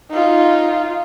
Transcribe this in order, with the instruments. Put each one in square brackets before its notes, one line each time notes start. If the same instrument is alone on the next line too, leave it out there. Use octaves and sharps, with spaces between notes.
[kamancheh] D#4 F4